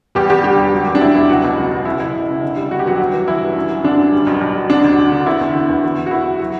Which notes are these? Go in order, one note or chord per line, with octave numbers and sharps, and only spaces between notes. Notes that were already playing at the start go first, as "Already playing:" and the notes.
E2 G3 G4
E2 G3 G4
D3 G3 G4
E1
F#3
E2
D4
E1 E4
E2 E4
C#2 F#3 F#4
B2
C#2
F#3
C#3 E4
F#1 E4
F#1
C#3
D3
G3
D3 F#4
G4
E2 F#3 F#4
G1
E3
E3 E4
G2
F#2
F#3
D3 D4
F#2
G3
B1
B1
B1
D3 D4
D2
D2
D3
E2 E4
E2
D3
E2
E2
E2
F#4
E2 E4
F#3
F#3 F#4